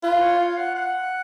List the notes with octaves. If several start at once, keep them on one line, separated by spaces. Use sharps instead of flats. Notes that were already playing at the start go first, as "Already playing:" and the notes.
F4 B4
C#5
F5
F#5
F#5